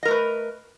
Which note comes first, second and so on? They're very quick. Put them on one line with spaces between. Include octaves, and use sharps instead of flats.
D#5 A#4 A3 B4